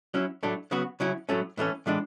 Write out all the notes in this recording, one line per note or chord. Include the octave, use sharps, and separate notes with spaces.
F#3 C#4 E4
A2 F#3 A3 D4
C#3 F#3 B3 F#4
C#3 F#3 C#4 E4
A2 F#3 A3 C#4
A2 E3 A3 C#4
A2 E3 G#3 D4